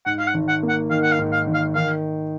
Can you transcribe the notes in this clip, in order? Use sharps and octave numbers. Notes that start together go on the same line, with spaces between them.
G#2 F#5
F5
F#5
G#1
F#5
A#3
F#5
D#3 F5
F#5
F5
G#2
F5
G#1
F5
D#3 F5